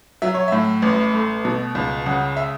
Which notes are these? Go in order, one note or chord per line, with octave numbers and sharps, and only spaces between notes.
F#3 E5
C#5
A2 E5
A1
A3
B2
C#2
C#3 F#5
E5